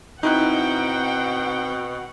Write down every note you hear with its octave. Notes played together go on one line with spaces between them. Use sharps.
B2 C4 D#4 E4 F#5 G5 F#6